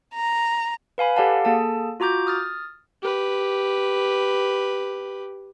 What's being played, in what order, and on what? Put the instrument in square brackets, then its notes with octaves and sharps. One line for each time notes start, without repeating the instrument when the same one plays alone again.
[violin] A#5
[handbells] B4 F5 G#5 B5
G4 A4 D5 F5 F#5 A5
A#3 G#4 A4 A5
F4 F#4 A#5 D6 G6
D#6 F6 A6
[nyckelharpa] G4 B4